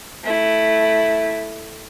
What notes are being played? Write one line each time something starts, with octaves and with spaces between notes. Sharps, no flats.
A3 E4